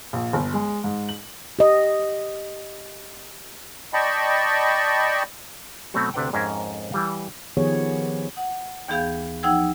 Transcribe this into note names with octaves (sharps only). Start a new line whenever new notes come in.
A#1
G1
G#3
G#2
F#7
G4 D#5
D5 D#5 G5 A5 B5 C#6
B2 F#3 A3 C4 F#4
D2 C3 D4 B4 F#5 G5
F2 G#2 C#4 G#4 A#4 E5
E3 G3 F5
D#3 F3 B3 G4 G#4 C#5
F#5
D#2 E3 B3 G#4 F5 G6
F3 D#4 F#5 G5 E6 G#6